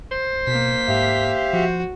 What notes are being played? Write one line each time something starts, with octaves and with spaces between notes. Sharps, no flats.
C5
B2 A#3 B6
G#2 G4 E5 F5
F3 F#4